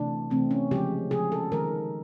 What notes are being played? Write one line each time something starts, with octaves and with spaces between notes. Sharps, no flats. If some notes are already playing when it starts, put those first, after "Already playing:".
Already playing: C3 E3 A3 D4
C3 E3 A3 C4
C#4
C#3 F3 G#3 G4
C#3 F3 G#3 G#4
A4
D#3 G#3 A#4